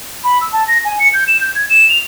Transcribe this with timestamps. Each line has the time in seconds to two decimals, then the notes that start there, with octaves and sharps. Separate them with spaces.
0.24 B5
0.41 E6
0.53 A5
0.68 A#6
0.85 G#5
1.00 C#7
1.14 G6
1.28 E7
1.41 G6
1.55 G#6
1.70 E7
1.89 F7